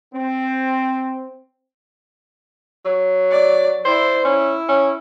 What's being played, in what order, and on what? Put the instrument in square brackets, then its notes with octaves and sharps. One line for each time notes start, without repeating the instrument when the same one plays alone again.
[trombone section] C4
[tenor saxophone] F#3
[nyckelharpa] D5
[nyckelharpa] E4 D5 [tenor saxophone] C5
[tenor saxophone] C#4 [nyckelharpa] E4
[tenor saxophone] C#4